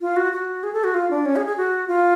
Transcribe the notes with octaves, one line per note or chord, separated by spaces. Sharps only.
F4
F#4
F#4
G#4
A4
F#4
F4
D4
C#4
G#4
G#4
F#4
F4